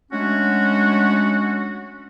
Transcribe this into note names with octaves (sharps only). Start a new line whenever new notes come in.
F#3 G#3 A3 C#4 D4 F#4